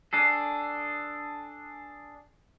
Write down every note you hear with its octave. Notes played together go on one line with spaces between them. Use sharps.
D4 G#4 A4